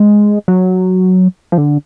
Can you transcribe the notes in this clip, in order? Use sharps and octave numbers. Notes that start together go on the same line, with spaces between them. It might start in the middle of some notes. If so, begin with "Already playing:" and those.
Already playing: G#3
F#3
F3
D3